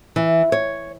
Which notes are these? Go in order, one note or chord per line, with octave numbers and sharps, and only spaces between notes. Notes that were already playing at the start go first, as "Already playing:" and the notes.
E3
C#5